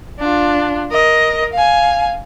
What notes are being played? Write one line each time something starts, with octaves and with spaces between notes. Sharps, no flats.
D4 F4
A#4 D#5
F5 G#5